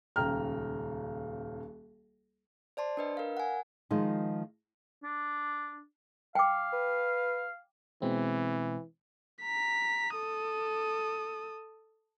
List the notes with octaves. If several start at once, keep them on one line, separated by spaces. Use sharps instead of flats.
D#1 C#2 G5 A#5 F6
C5 D5 A5 C6
D4 B4 D#5
A#4 F5
F#5 G#5
D#3 F3 G#3 D#4
D4
F5 G5 D6
B4
B2 E3 G#3 C4
A#5 B6
A4 D#6